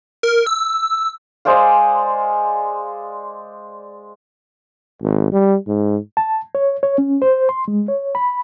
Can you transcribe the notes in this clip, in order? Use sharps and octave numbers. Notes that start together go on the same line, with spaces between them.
A#4
E6
G#3 C5 D5 F5
G#1
G3
G#2
A5
C#5
C#5
C#4
C5
C6
G#3
C#5
B5